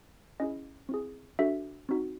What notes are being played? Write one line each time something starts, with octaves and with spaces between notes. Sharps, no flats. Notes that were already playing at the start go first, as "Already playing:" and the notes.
C#4 E4 G#4 D#5
C4 E4 G#4
D4 F#4 A4 E5
C4 D#4 F#4